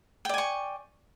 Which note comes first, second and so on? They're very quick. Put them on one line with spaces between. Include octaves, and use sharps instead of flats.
G5 D5 G#5 C#6